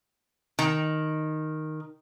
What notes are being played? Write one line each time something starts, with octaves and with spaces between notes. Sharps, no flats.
D#3